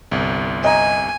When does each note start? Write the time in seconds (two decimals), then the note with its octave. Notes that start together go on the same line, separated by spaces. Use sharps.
0.12 G1 C2
0.64 D#5 G#5 A#5